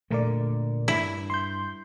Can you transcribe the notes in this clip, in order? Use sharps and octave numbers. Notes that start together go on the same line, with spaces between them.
A#2 D3 A3 A#4 D5
G2 E4
C6 G6